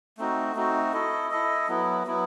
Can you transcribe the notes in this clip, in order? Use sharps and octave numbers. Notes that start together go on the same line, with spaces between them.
A3 C4 D#4 F#4
A3 C4 D#4 F#4
E4 A4 D#5
E4 A4 D#5
F#3 B3 E4
F#3 B3 E4